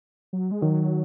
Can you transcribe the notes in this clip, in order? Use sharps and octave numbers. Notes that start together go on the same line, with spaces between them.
F#3
G#3
D#3 F#3